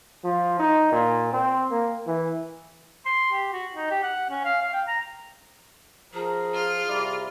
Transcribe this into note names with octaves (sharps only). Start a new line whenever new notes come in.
F3
D#4
A#2
C4
A#3
E3
C6
G4
F#4
D#4
G4
F#5
C#4
F5
F5
G5
A#5
F3 G#4 A#4
F4 F6
C3 G3 E4 A#4 D5